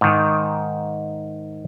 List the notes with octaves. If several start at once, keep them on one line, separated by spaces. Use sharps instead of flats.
G#2 D#3